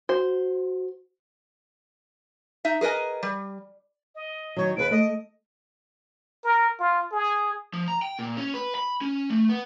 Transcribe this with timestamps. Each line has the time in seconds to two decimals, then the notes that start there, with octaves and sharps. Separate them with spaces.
0.09 F#4 C5
2.65 D#4 E5
2.81 G#4 A#4 B4 D#5 G#5
3.23 G3
4.15 D#5
4.56 D#3 F#3 C#5
4.77 D#2 G#4 B4 D7
4.91 A3 D#5
6.44 A#4
6.80 F4
7.12 G#4
7.73 F3
7.88 A#5
8.02 G5
8.19 A#2
8.37 C#4
8.54 B4
8.75 B5
9.01 C#4
9.30 A3
9.49 B3